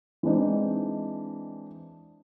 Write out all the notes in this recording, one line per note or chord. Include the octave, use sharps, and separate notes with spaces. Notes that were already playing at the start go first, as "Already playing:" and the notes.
E3 G#3 C4 D4 D#4